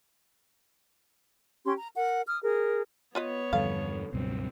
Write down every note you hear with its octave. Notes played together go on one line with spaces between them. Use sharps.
C#4 G4 C6
A#5
A#4 F#5
D#6 F6
G#4 A#4
B3 F4 B4 C#5 D#5
E2 G2 D3 F3 G3 A4 F5
C#2 G2 B2 F#3 C4